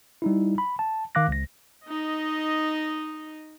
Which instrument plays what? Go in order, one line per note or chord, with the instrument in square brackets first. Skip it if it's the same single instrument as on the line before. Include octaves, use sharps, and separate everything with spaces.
[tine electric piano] G3 D#4 E4
B5
A5
D#3 F5 D6 F#6 A#6
C#2 A#6
[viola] D#4 D#5